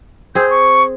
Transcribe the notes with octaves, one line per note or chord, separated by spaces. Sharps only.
C4 G#4 G6
C#6